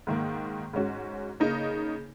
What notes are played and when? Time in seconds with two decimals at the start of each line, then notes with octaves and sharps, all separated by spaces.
0.07 G#2 D#3 A#3
0.73 G#2 G#3 C#4 F#4
1.40 C#3 A#3 D#4